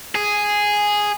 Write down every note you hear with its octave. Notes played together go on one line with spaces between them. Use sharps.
G#4